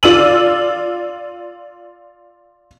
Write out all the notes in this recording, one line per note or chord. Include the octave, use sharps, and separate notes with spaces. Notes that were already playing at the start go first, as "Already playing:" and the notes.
F4 D5 E6 D#7 F#7